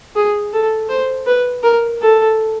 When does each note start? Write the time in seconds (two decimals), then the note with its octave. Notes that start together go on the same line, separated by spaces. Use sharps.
0.16 G#4
0.53 A4
0.89 C5
1.27 B4
1.63 A#4
2.01 A4